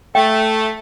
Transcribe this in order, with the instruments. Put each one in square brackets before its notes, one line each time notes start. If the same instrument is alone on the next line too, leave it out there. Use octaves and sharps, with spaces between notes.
[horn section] A3 [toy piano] G5